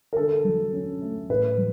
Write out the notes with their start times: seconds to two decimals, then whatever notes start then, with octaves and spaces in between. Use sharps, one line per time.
0.13 A#4
0.16 D3 A4
0.45 F#3
0.73 C#4
1.02 A3
1.29 A2 B4
1.58 F#3